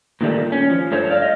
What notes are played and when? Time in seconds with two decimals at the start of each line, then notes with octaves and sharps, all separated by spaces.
0.21 A#2 D#3 G3 A3
0.52 C#4
0.70 F3
0.91 G2 A3 C5 C#5
1.10 D5 F5
1.22 D#5